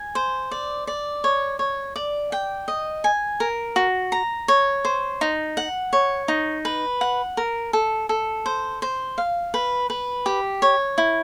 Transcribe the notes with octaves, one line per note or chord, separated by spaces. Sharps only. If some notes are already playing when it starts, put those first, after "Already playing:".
Already playing: G#5
C5
D5
D5
C#5
C#5
D5
G5
D#5
G#5
A#4
F#4
A#5
C#5
C5
D#4
F#5
C#5
D#4
B4
F#5
A#4
A4
A4
C5
C5
F5
B4
B4
G4
C#5
E4